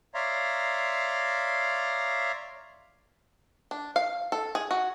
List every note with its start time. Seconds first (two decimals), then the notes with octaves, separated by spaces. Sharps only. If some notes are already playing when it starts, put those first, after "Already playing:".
0.14 C#5 D5 E5 F5 A#5 C6
3.71 D4
3.96 F5
4.32 A4
4.55 G#4
4.71 F#4